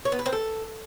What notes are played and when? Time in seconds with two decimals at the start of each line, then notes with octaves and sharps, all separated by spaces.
0.05 C#5
0.12 B3
0.19 B4
0.26 C4
0.32 A4